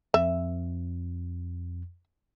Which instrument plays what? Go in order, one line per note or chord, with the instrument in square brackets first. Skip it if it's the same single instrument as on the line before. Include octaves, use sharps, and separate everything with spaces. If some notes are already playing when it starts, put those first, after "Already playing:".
[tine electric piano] F2 [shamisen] E5